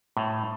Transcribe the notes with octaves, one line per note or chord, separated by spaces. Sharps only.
A2